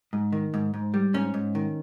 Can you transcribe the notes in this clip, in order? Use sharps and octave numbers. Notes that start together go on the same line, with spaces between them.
G#2
D#3
G#2
G#2
G3
G#2 C#4
G#2
D#3